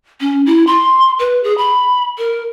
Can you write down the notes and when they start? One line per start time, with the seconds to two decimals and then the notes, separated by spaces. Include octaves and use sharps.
0.21 C#4
0.46 E4
0.67 C6
1.19 B4
1.44 G#4
1.58 B5
2.18 A#4